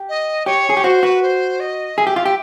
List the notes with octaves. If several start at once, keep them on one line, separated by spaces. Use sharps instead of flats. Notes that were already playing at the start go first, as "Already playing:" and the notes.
Already playing: G4
D#5
G4 C#5
G#4
G4
F#4 C5
F#4 B4
C5
D#5
G#4 E5
G4
F4
G4